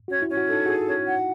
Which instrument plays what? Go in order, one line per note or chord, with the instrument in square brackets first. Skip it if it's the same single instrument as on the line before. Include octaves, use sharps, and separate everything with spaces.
[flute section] C#4 [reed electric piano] F#4
[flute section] C#4 [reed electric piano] E4
[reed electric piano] F#4
[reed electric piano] D#4 [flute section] A4
[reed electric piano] F#4 [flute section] G#4
[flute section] C#4
F#5